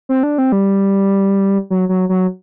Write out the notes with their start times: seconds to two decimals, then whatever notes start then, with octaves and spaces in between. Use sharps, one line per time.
0.09 C4
0.23 D4
0.38 C4
0.52 G3
1.70 F#3
1.89 F#3
2.09 F#3